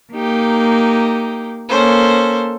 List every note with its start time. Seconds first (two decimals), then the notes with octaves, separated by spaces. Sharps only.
0.12 A#3 D#4 G4
1.69 A#3 C#4 A4 C5